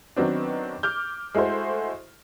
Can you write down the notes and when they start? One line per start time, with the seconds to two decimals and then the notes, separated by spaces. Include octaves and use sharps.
0.16 D#3 F#3 B3 C4 D4
0.83 D6 F6 G6
1.35 G#3 A3 E4 F#4 C5